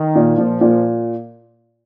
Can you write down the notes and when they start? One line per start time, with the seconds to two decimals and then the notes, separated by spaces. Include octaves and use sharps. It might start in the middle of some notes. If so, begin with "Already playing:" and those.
Already playing: D#3
0.15 A#2
0.37 A#2 F3
0.61 A#2